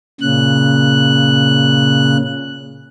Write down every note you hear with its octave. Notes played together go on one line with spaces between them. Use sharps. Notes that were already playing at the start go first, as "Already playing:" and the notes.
A#2 C#3 F#6